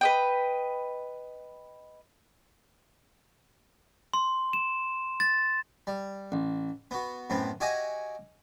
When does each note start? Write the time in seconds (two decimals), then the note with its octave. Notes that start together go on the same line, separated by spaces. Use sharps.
0.01 B4 D#5 G5
4.14 C6
4.53 E7
5.20 A6
5.87 G3
6.32 A1
6.91 B3 F#4
7.30 F#2 A2 B3 C4
7.60 F#4 G4 D#5 E5 F#5 G#5